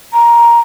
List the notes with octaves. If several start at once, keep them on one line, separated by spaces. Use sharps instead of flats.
A#5